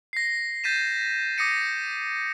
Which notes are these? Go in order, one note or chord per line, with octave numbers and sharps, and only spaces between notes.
A#6 C7
G6 A6 B6 D#7 E7
D6 D#6 A#6 C#7 D#7